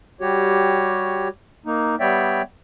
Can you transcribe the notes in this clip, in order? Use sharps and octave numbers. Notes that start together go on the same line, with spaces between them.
G3 F#4 G4 C#5
A#3 D#4
G3 B3 C#5 D5 E5 G5